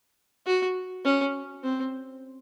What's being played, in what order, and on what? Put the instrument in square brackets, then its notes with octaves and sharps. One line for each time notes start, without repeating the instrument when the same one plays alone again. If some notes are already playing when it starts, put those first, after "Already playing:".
[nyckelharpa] F#4
C#4
C4